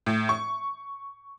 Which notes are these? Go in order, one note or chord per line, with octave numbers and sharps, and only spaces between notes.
A2
C#6